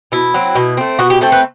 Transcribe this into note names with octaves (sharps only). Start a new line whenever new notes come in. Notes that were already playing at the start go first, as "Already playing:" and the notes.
B2 E4
F#3 C4
B2
A3 C4
B2 F#4
G4
A3 C4 A4
B4